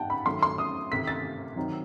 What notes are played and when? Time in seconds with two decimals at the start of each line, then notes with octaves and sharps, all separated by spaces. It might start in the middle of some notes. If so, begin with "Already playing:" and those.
Already playing: D#3 G3 D#4 F#5 G5 A5
0.10 B5
0.26 D#3 F#3 A3 C6
0.43 C6
0.58 D#6
0.92 C3 D#3 A3 B6
1.07 A6
1.56 D#3 F#3 C4 D#4